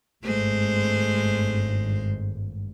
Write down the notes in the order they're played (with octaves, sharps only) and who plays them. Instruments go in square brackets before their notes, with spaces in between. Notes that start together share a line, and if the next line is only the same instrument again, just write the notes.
[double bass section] G#1 G2 [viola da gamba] G#3 A3 C5